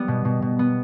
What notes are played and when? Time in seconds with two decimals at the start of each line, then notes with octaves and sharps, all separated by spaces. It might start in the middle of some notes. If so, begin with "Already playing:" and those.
Already playing: G3 B3
0.08 B2
0.25 B2
0.42 B2
0.59 B3